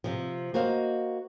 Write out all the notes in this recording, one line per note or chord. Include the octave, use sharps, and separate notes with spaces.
C3 F3
A#3 F#4 C5 D#5 F5